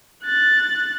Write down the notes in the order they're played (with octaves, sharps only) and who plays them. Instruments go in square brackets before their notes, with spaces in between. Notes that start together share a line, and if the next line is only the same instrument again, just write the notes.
[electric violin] F#6 A6